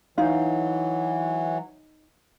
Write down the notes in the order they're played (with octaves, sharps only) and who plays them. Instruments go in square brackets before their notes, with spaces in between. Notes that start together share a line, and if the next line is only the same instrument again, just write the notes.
[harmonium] E3 F#3 [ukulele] D#4 F5